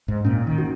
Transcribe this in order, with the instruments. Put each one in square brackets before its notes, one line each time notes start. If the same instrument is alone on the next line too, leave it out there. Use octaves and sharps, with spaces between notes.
[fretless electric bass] G#2
[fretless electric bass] A#2 [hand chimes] C#4
[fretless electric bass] D#3
[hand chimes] F#4